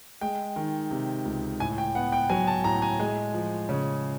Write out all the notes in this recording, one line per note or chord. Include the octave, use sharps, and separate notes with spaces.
G#3 G5
D#3
C3
C#2
A2 G#5
G5
B3 F#5
G5
F#3 G#5
A5
A2 A#5
G#5
G#3
F3
C#3